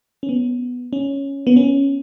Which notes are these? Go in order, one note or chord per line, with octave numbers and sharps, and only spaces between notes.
C#4
B3
C#4
B3
C#4